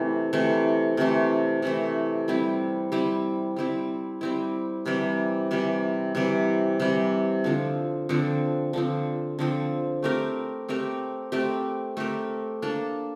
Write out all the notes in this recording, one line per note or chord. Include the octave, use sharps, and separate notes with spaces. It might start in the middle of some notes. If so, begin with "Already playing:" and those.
Already playing: C3 E3 A3
C3 E3 A3
C3 E3 A3
C3 E3 A3
G3 C4 E4
G3 C4 E4
G3 C4 E4
G3 C4 E4
C3 E3 G3
C3 E3 G3
C3 E3 G3
C3 E3 G3
D3 F3 C4
D3 F3 C4
D3 F3 C4
D3 F3 C4
A3 C4 G4 A#4
A3 C4 G4 A#4
A3 C4 G4 A#4
A3 C4 G4 A#4
A#3 D4 A4